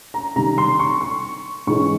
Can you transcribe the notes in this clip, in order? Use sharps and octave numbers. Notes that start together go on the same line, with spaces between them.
A#5
C3 D#3 G3 A#5
C6
C#6
C#6
G#2 E3 G#3 C#4 C#6